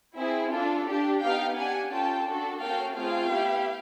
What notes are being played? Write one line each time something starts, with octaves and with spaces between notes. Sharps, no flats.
C4 E4 G#4
D4 F4 A4
D4 G4
B3 D#4 G4 F5 G5
D4 G4 F#5 G#5
C#4 F4 A4 G5 A5
D4 F#4 A4
A#3 C#4 F#4 A4 F5 G5
A3 C4 F4 G#4 F5 G5
B3 E4 G4